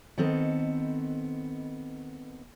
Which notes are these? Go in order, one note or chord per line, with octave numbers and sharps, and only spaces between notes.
D#3 B3 C4 A4 D#5